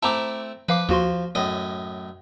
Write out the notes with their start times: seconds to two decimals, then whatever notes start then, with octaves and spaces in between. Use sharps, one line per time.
0.03 A3 C4 E4 A5 A#5 D6
0.69 F3 B4 F5 D6
0.89 D#2 F3 F#4 C6
1.35 F#2 A2 D#5